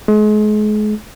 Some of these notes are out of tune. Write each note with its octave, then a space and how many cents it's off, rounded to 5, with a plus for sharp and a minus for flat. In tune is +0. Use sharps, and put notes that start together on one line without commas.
G#3 +35